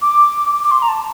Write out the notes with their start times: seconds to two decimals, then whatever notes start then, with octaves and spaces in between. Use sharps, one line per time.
0.02 D6
0.63 D6
0.71 C6
0.82 A#5
0.88 A5